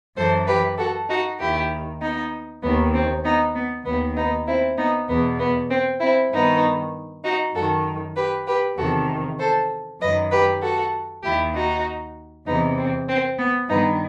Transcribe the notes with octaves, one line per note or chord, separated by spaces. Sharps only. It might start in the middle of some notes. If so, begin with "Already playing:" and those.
F#2 E3 A4 C5
G4 B4
F#4 A4
D#4 F#4
D#2 D#3 E4 G4
B3 D#4
D#2 D#3 B3
C4
B3 D#4
B3
D#2 D#3 B3
B3 D#4
C4 E4
B3 D#4
E2 B2 B3
B3
C4
C4 E4
G2 D#3 B3 D#4
D#4 F#4
F#2 D#3 F#4 A4
G4 B4
G4 B4
E2 C3 D#3 F#4 A4
A4 C5
F#2 D#3 B4 D#5
G4 B4
F#4 A4
D#2 D#3 E4 G4
D#4 F#4
E2 C3 E3 B3 D#4
C4
C4
B3
G2 D#3 B3 D#4